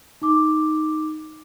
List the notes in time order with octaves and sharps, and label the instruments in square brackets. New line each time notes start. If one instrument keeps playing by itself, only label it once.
[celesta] D#4 D6